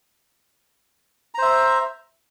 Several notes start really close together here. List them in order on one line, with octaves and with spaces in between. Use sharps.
A#5 C5 E5